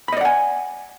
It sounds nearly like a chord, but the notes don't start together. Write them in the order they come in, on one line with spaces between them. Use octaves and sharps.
B5 D#5 D5 F#5 G#5